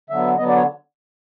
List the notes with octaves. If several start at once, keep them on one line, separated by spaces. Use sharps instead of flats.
D3 F#3 B3 E5
D3 F#3 B3 D#5
D5
C#5